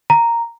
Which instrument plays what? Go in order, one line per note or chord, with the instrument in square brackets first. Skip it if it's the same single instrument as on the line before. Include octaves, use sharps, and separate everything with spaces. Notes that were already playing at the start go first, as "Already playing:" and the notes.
[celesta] A#5